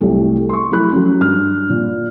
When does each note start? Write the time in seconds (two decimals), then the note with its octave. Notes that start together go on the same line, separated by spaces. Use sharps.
0.01 C2 F#3 A3 G4
0.49 C6 C#6
0.72 F#3 A3 E4 B5 F#6
0.92 F#3 C#4
1.21 G2 F6
1.70 A#2